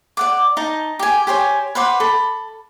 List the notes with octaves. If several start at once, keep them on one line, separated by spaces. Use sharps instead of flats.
D5 F#5 D6
D#4 A5
G4 G#5
G4 C5 C#5 G#5
B4 C5 F#5 D6
A4 B5